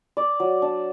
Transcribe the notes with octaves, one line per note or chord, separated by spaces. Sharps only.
D5
F#3
D4